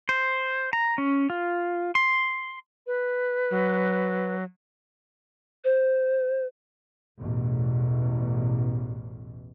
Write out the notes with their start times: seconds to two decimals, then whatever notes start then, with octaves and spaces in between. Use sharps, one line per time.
0.09 C5
0.73 A#5
0.98 C#4
1.30 F4
1.95 C6
2.87 B4
3.51 F#3
5.65 C5
7.19 A1 E2 B2